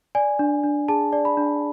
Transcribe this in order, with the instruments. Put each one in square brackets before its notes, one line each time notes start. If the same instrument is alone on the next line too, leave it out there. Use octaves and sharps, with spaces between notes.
[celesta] D5 G#5
D4
D4
G#4 A5
D5
B5
D4